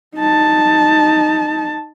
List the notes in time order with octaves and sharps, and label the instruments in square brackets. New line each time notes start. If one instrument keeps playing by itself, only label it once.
[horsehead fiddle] D#4 A5